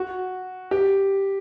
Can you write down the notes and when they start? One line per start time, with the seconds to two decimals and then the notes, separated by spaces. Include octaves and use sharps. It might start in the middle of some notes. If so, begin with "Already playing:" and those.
Already playing: F#4
0.71 G4